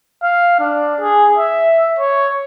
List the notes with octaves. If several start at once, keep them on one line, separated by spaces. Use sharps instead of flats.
F5
D4
G#4
E5
C#5